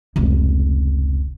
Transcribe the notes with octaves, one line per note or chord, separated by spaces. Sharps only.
F1 C#2